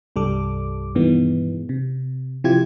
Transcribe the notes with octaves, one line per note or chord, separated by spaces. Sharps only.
C2 G2 G3 A4 D6
G2 B2 D#3 E3 G#3 B3
C3
C3 F3 E4 F4 G4 G#6